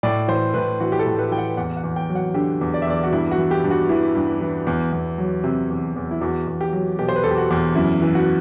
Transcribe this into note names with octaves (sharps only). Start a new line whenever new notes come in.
A2 D5
E3 C5
A2 B4
E3 F#4
G4
A4
A2
B4
E3 G5
F#5
E2 F#5
F#5
E2
G5
F#3
F#5
D3 G4
E2
D5
E5
E2 D5
F#4
G2 E4
F#4
E3
G4
G2
F#4
E3 E4
G2
E3
E2
E2
F#3
C3
E2
E2
E4
E2 F#4
E2
G4
F#3
B2 G4
C5
B4
E2 A4
G4
F#4
E2
F#2 E4
E3
F#4